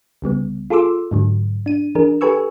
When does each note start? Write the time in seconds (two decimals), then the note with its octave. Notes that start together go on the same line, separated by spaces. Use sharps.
0.22 C2 C#3 G3 B3
0.70 F4 G#4 A4 C6 D6 E6
1.11 G#2 D3 F#3
1.66 D4 D#7
1.95 E3 D4 G#4 A#4
2.21 G4 A4 B4 G#5 C#6 E6